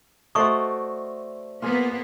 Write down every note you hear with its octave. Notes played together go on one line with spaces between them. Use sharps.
A3 F#4 C5 D5 D#5 C#6 D#6
A#3 B3 F4 G#4